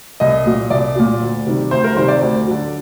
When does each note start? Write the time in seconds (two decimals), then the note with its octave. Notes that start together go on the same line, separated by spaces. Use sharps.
0.20 C2 D#5
0.46 A#2 F#3
0.70 C2 D5
0.95 A#2 F#3
1.21 D2
1.47 C3 D#3 G3
1.71 D2 C5
1.84 A#4
1.96 C3 D#3 G3 C5
2.08 D5
2.21 D2
2.47 D3 F#3